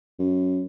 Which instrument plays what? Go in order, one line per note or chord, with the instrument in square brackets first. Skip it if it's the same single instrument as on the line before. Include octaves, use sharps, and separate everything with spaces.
[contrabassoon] F#2